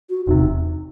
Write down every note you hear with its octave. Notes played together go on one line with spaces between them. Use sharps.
F#4
E1 E2 C3 D#4